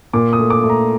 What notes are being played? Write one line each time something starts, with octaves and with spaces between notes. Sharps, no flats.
A#2 D6
D#6
A3
D6
A3
A#5